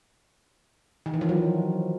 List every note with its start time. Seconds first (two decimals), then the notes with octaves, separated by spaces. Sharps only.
1.06 D#3
1.14 E3
1.21 F3
1.29 F#3